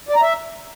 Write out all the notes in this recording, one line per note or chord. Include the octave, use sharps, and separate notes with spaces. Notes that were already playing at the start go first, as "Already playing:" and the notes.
D5
A#5
E5